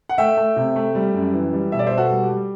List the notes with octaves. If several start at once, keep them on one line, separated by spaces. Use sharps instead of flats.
F#5
A3 E5 G5
A3
C3
A3
G3
F#2
E3
G3
B2 E5
D5
B2 C5 E5
F#4 A4
G3
G4
G3